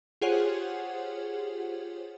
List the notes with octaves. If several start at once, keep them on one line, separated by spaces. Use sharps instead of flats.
F4 G4 G#4 C5 C#5 F#5